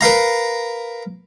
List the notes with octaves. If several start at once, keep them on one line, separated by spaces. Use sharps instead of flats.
A#4 B4 F5 A#5